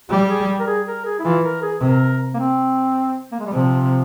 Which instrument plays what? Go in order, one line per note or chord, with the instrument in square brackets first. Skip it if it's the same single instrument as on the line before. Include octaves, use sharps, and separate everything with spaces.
[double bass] G3 [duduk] G4
[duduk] G#4
A#4
G#4
A#4
G#4
E4
[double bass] E3 [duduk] F4
[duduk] A#4
G#4
[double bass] C3 [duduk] A#4
[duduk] A#3
C4
A#3
G#3
G3
[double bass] C3 [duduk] F3